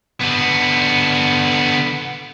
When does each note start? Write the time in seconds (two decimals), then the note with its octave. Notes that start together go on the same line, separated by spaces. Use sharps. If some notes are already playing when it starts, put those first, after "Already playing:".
0.21 D3 B3